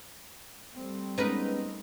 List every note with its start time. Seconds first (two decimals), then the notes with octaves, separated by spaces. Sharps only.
0.75 G3 A3 C4
1.18 G#3 B3 C#4 D#4 A#4 B4